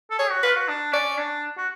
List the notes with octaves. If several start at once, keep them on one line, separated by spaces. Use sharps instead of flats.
A4
G#4 C#5
F#4
F4 B4
F#4
D4
C#4 D5
D4
F#4